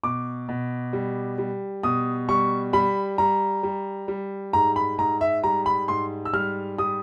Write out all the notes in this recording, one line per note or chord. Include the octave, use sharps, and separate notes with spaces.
B2 D6
B2
G3
G3
B2 D#6
G3 C#6
G3 B5
G3 A#5
G3
G3
G#2 A#5
B5
G#2 A#5
E5
G3 A#5
B5
G#2 C6
E6
G3 F6
G3 D#6